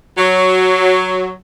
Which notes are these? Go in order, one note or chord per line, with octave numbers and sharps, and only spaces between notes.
F#3